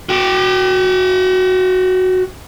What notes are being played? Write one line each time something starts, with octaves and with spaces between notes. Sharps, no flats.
F#4 G5